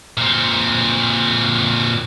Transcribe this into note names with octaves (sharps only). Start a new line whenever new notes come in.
A#2 C4